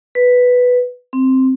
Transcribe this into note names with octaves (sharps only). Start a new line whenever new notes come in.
B4
C4